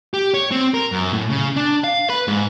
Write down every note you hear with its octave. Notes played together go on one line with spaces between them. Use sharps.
G4
C#5
C4
A#4
F#2
A2
C#3
D4
F5
B4
G#2